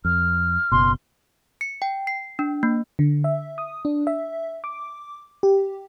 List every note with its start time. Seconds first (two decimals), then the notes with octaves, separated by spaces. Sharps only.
0.05 F2 F6
0.72 F#1 B2 C6
1.61 C#7
1.82 G5
2.07 C7
2.39 D4
2.63 A#3
2.99 D3
3.24 E5
3.58 D#6
3.85 D4
4.07 E5
4.64 D6
5.43 G4